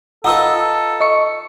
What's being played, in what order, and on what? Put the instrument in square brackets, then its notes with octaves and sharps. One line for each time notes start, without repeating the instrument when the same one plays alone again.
[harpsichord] D#4 F4 B4 [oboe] A4 [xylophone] F#5 D#6 E6
[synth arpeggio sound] D#5 C#6 C#7